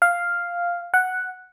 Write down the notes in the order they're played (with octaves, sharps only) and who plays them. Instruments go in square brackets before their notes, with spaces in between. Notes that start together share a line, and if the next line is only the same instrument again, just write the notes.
[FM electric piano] F5
F#5